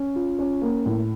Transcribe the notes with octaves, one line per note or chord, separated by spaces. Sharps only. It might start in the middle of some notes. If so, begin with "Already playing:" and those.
Already playing: C#4
F4
C#4
A#3
A2